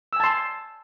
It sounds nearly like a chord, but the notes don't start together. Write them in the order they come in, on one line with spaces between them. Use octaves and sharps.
E6 G#5 A5 C6